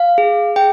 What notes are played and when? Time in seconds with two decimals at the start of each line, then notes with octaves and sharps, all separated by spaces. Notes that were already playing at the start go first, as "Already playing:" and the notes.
Already playing: F5
0.18 G#4
0.56 G#4 G5